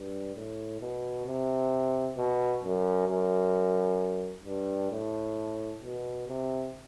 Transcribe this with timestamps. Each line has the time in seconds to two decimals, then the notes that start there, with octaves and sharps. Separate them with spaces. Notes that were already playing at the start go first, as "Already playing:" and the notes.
Already playing: G2
0.36 A2
0.81 B2
1.26 C3
2.17 B2
2.64 F#2
3.09 F#2
4.46 G2
4.92 A2
5.83 B2
6.29 C3